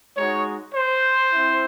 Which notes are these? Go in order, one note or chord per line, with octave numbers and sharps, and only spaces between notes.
G#3 D#4 F#4 C#5
C5
C4 E4